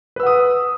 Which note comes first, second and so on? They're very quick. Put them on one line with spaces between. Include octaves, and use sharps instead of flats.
B4 E6 F#5 D#6